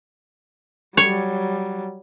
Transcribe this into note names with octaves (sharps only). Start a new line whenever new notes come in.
F#3 G3 C#5